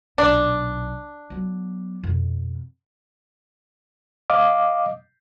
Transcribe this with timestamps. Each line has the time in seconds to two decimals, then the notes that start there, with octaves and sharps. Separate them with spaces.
0.18 B1 A#2 D4
1.30 F#3 B3
2.03 F2 B2
4.30 D#5 F5 D6